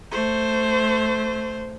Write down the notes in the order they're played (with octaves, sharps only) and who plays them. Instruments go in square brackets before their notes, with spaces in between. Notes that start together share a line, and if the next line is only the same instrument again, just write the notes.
[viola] A3 C5